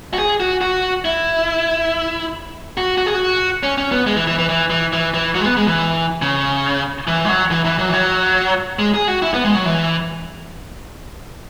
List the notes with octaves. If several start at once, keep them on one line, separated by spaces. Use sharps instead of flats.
F#4
G#4
F#4
F#4
E4
F#4
F#4
G#4
F#4
C#4
C#4
B3
G#3
E3
E3
E3
E3
E3
E3
E3
F#3
G#3
B3
G#3
E3
C#3
E3
G#3
F#3
E3
E3
F#3
E3
F#3
G#3
G#4
F#4
E4
B3
G#3
F#3
E3